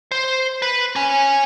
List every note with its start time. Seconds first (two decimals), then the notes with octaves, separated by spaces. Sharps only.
0.12 C5
0.62 B4
0.96 C#4 G#5